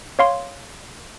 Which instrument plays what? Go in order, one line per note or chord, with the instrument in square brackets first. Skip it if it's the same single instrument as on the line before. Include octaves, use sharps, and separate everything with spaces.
[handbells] C#5 F5 C6